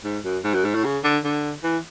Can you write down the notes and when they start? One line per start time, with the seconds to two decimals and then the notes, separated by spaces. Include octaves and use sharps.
0.04 G#2
0.24 F#2
0.44 G#2
0.54 F#2
0.64 G#2
0.75 A2
0.84 C#3
1.04 D3
1.24 D3
1.63 E3